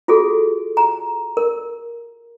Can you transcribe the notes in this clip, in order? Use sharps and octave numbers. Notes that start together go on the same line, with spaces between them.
F4 F#4 G#4 A4
A#5
A#4